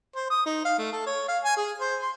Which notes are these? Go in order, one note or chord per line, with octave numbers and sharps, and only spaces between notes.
C5
D#6
D#4
F5
A3
A4
C#5
F5
G#5
G#4
C5
C6